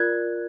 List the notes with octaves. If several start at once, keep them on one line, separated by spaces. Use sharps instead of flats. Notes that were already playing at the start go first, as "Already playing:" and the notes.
Already playing: F4 A#4 D5 F#6 G#6